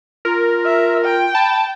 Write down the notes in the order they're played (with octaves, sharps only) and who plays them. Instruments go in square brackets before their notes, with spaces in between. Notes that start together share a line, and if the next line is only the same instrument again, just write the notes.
[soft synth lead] F4 [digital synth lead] A#4
[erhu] E5
G5
[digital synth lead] A5 [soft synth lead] B5